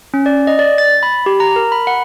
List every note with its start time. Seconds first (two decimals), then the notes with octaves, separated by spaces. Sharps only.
0.14 C#4
0.26 D5
0.47 D#5
0.59 D5
0.78 A6
1.03 B5
1.26 G4
1.40 A#5
1.56 A#4
1.72 B5
1.87 F#5